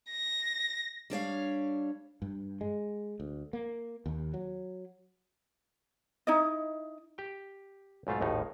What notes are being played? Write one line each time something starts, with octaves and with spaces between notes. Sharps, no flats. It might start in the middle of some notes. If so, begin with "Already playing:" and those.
A#6
G3 D4 C#5 F5
G2
G#3
D2
A#3
D#2
F#3
D#4 E4 D#5
G4 G5
B1 G#2 A3 F4
G#1 D#2 A2 D#4